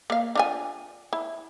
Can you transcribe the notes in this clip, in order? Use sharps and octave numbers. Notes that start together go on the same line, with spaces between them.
A#3 F5
D4 F4 G#5
E4